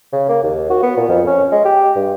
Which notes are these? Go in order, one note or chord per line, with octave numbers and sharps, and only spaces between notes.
C#3
A#3
D#2
F#4
B3
A#2
F2
C#4
G#3
G4
G2